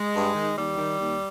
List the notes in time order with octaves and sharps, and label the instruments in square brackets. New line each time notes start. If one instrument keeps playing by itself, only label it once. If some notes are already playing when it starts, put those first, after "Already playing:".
Already playing: [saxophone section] G#3
G2
D#3
D#2 G3
D#3
D#2